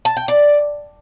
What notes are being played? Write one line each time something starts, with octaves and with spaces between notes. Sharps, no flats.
A5
G5
D5